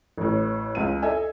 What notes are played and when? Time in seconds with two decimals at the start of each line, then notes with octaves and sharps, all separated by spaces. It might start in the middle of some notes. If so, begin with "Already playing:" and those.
0.18 A1 A2
0.75 C#2 D#7
1.02 A4 D#5 E5 G#5